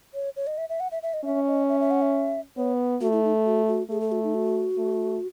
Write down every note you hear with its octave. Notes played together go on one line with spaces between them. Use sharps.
C#5
C#5
D#5
E5
E5
F#5
E5
E5
D#5
C#4 E5
D#5
E5
E5
F#5
E5
B3 C#5
A3 F#4
E4
D#4
F#4
F#4
A3 G#4
A4
F#4
D#4
F#4
A3